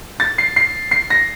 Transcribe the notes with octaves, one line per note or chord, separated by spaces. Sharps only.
A6
C7
C7
C7
A#6